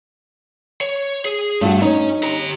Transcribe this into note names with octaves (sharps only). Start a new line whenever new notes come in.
C#5
G#4
G2 A3 F#4
C#4 D#4 C#5
G4 A#5